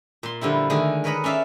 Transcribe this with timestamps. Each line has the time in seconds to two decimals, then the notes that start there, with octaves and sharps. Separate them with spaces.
0.23 A#2 C6
0.41 D3 F3 G3 E4
0.70 D3 D#3 G#3 A3 G#4
1.04 A#4 B4 C#5 D#5 B5
1.24 C#4 D5 E5 F5 A5